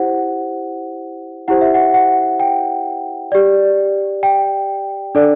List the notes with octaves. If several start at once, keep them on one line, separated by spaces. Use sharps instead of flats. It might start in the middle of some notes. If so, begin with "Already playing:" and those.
Already playing: E4 G4 C5 F#5
E4 G4 C5 F#5
E5
F#5
F#5
G5
G4 D5
G5
D4 A4 D5